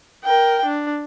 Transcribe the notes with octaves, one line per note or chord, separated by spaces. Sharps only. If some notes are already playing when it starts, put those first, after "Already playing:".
A#4 G5
D4